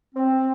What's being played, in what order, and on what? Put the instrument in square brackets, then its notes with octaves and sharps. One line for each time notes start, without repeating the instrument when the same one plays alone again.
[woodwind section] C4